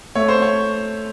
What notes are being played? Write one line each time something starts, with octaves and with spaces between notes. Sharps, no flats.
A3 C#5
C5
C#5